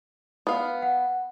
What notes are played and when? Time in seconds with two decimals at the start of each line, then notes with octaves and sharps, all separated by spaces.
0.47 B3 F5
0.82 F#5